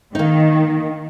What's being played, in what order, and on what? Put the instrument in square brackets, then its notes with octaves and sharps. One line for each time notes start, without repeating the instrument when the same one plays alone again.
[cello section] D#3 [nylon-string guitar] A#3 D#4